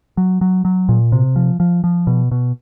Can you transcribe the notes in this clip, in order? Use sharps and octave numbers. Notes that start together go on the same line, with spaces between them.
F#3
F#3
F#3
A#2
C3
F3
F3
F3
B2
B2